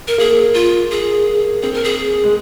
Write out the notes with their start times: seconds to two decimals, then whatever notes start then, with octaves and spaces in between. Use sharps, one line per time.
0.08 A#4
0.18 A#3 G#4
0.54 F4
0.91 G#4
1.62 C4 G#4
1.74 A#4
1.84 G#4
2.24 G#3